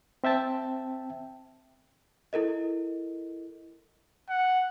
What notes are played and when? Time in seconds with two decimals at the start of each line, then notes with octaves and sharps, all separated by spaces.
0.24 C4 E5 G5 A5
2.33 E4 A4 A#4 D#5
4.29 F#5